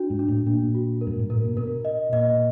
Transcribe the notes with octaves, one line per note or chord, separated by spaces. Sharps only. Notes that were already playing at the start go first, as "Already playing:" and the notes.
Already playing: D4 F#4
G#2
D4
A2
A#2 D4
F#4
A#4
G2
G#2
A2 A#4
A#2
B2 A#4
D#5
A#2 D#5